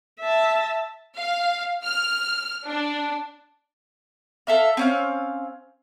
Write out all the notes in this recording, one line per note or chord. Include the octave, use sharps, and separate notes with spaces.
E5 A5
F5
F6
D4
A4 E5 F5
C4 C#4 F5